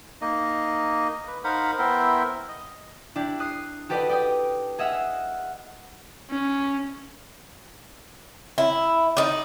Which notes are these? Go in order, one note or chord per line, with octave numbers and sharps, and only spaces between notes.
A#3 D#4 D#5
B4
D#4 A#4 C5 F5 F#5 B5
B3 E4 A#4 C5 E5 G5
D#5
D4 E4 G4
D#6 F#6 C7
F#4 G4 A4 B4 D5 D#5
D5 G5 D#6
G#4 D#5 E5 F#5 E6 F6
C#4
E4
D#4 D5